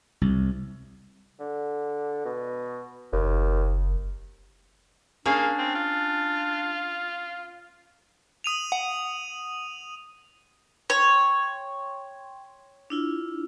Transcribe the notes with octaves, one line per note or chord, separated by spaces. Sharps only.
C2
D3
B2
F#1 D#2
A#3 C#4 D4 G#4 F5
C4
F4
D#6 D#7 F7
F#5
C#5 G5 C6
D4 E4 F4